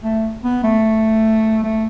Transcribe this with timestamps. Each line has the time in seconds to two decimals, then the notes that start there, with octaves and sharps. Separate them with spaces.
0.04 A3
0.44 B3
0.64 A3
1.64 A3